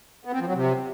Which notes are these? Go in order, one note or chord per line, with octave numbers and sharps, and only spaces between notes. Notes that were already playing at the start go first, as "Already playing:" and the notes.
B3
C4
F3
F#3
C3